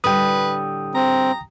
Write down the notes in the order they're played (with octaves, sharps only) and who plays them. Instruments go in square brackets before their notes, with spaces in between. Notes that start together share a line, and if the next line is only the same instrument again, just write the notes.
[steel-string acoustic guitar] A2 D3 G3 [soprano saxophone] B4 [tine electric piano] G5 D#6
[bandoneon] C4 [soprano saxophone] A#5